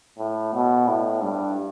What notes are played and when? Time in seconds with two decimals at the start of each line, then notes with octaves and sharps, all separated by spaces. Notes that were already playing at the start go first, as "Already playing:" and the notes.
0.18 A2
0.54 B2
0.88 A2
1.22 G2